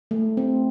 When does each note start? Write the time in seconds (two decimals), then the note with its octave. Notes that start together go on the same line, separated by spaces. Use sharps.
0.11 A3
0.37 C4